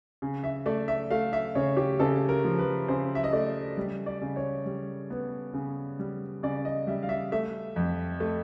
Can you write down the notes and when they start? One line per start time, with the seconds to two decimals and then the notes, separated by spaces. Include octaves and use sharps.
0.22 C#3
0.44 E5
0.66 A3 D5
0.88 E5
1.11 A3 F5
1.33 E5
1.55 C#3 C#5
1.77 G4
1.99 C#3 A4
2.29 A#4
2.44 F3
2.58 B4
2.88 C#3 C5
3.15 E5
3.24 D#5
3.33 A3 D5
3.77 G3
4.06 D5
4.22 C#3
4.36 C#5
4.66 G3
5.10 B3
5.54 C#3
5.99 G3
6.43 C#3 D5
6.65 D#5
6.87 G3 E5
7.03 F5
7.09 E5
7.32 A3 E5
7.76 F2
8.20 A3